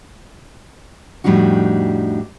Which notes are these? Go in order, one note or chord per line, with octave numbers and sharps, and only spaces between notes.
F2 A2 G3 D4 D#4 F#4